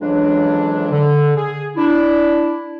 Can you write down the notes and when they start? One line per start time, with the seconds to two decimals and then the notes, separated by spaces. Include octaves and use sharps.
0.01 F2 C#3 E3 F#3 G#3 D4
0.91 D3
1.37 G#4
1.77 D4 E4